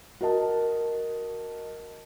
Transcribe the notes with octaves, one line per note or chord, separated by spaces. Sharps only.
F#4 A#4 D#5 A5